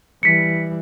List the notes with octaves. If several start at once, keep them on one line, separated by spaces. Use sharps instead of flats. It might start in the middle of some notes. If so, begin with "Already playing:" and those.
E3 G3 B6 C#7